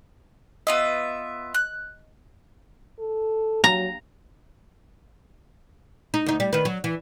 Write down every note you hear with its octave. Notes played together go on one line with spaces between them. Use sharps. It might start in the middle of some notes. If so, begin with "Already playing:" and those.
B3 F4 D#5 E5
F#6
A4
F#3 A#5
D#4
D2 D#4
G3
D#3 B4
F#3
E3